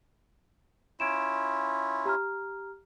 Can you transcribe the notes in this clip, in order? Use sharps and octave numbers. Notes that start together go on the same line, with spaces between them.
C#4 E4 F4 G#6 D7 E7
G4 A#5 F6